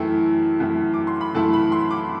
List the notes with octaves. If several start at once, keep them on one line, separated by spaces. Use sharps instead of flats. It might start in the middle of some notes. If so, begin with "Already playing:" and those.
Already playing: F#2 E3 A3 E4 G5
F#2 E3 A3 E4
D6
C6
B5
F#2 E3 A3 E4 A5
B5
C6
D6